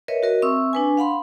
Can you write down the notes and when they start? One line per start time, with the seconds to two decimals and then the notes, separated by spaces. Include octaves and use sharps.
0.08 A#4 B4 C#5 D#5 E5
0.23 F#4 A#4 D#5
0.42 C4 E5 C#6 D#6 E6
0.73 D4 B4 G#5
0.97 F5 F#5 B5 C6